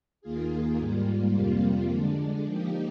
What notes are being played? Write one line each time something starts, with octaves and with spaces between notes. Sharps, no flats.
D#2 D#3 A#3 F4 G#4
G#2 G3 A#3 F4
F2 C3 G3 A#3 F4
D3 G#3 D4
F3 A#3 D#4 G4